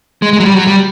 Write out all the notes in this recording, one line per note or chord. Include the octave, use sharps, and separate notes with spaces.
G#3
G#3
F#3
G3
F#3
G3